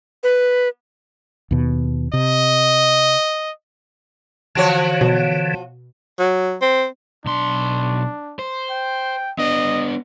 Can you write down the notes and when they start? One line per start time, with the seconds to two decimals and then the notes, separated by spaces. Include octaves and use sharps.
0.23 B4
1.51 D#2 B2
2.13 C3 D#5
4.55 D3 E3 F3 F#4 C#5
5.01 B2
6.19 F#3
6.61 C4
7.26 B1 D4 C6
8.39 C5
8.70 G5
9.38 B3 D4 D#5